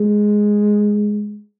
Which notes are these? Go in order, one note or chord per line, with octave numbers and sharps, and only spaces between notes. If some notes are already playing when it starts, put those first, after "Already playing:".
Already playing: G#3